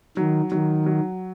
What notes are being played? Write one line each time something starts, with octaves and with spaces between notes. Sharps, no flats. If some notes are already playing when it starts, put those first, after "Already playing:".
D#3 F#3
D#3 F#3
F#3